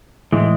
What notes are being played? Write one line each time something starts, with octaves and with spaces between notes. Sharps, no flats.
A2 E3 G#3